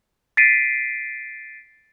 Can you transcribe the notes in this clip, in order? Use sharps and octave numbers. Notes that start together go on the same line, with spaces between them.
A6 B6 C7 D7 D#7